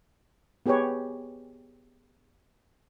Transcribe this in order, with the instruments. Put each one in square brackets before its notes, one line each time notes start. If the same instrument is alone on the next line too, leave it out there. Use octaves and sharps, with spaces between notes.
[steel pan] B3 G4 G#4 B4 C#5